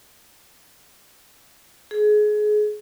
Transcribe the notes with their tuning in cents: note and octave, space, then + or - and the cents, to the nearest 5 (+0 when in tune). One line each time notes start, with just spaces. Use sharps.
G#4 +25